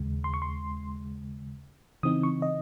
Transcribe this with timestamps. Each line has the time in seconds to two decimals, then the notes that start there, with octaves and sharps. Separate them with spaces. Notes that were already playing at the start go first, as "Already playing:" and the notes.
Already playing: D#2 C#3 G#3
0.24 C6
0.34 C#6
0.42 C6
2.03 C#3 E3 C4 D#4 D#6
2.23 C#6
2.42 D#5